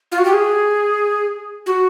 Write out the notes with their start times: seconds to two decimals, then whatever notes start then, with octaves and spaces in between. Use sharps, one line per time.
0.12 F4
0.18 F#4
0.25 G4
0.32 G#4
1.66 F#4